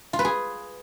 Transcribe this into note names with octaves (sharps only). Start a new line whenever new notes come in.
F4
B4
G#4